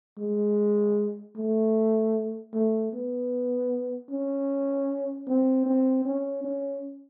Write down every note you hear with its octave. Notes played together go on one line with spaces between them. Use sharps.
G#3
A3
A3
B3
C#4
C4
C4
C#4
C#4